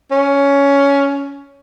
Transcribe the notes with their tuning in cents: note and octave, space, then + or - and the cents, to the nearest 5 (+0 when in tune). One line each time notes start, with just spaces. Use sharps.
C#4 +15